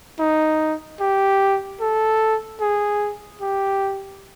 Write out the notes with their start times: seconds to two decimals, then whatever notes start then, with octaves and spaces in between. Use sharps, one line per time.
0.19 D#4
1.00 G4
1.80 A4
2.60 G#4
3.41 G4